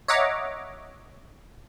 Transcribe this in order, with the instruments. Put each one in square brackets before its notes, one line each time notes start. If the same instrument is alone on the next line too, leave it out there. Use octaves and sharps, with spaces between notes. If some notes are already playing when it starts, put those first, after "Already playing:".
[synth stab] C#5 D#5 E5 F#5 A#5 D6